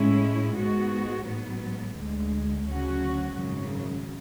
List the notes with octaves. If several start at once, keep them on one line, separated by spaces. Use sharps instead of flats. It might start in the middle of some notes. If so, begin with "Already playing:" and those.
Already playing: A2 G#3 C#4 E4
G#2 G#3 B3 F#4
A1 G#2 F#3 B3
D2 D3 G#3
D2 C#3 F#3 C#4 F#4
G#1 F#2 C#3 F#3